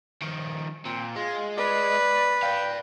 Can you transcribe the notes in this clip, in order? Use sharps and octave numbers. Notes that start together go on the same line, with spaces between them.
D#3 F3
A#2 C4
G#3 F4
B4 D5
D5 F5 G5